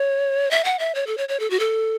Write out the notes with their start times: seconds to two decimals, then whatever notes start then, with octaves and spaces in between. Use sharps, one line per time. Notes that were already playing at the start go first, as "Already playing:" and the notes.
Already playing: C#5
0.51 E5
0.64 F#5
0.79 E5
0.95 C#5
1.07 A4
1.18 C#5
1.29 C#5
1.40 A4
1.50 F#4
1.60 A4